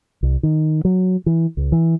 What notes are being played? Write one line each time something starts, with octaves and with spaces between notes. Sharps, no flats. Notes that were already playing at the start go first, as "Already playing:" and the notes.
C2
D#3
F#3
E3
C#2
E3